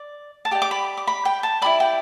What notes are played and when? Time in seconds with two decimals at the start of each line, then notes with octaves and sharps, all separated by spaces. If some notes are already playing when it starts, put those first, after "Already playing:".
Already playing: D5
0.45 A5
0.51 G4 D5 G5
0.62 D6
0.71 B5
0.97 D6
1.07 B5
1.25 G5
1.43 A5
1.62 E4 G4 D5 B5
1.80 G5